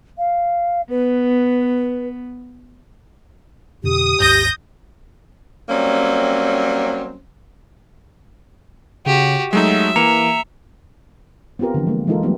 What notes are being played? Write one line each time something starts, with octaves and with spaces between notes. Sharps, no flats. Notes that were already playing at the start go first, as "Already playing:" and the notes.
F5
B3 B4
F2 B2 D3 G4 D#6
G#1 D#2 G#2 G6 A#6
F#3 G3 A#3 C4 C#4
C#3 F#4 G4
F#3 G#3 A3 D#4 E5
E3 A#3 A#5 C#7 F7
B3 C4 F4 G4 A#4
D3 E3 F3
G#3 A#3
E3 G#3 D#4 F4 A4 A#4
F#3 G3 A3 B3 D#4 G4